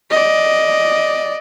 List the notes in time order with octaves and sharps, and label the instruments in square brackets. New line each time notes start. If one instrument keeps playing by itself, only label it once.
[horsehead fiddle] D5 D#5